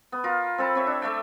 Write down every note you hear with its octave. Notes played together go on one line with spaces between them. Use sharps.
B3
F4 A#4
C4 A4 A5 B5
C4 C#5 E5
D4
A3 E5 G5